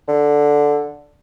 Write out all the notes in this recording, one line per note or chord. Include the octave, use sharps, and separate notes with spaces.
D3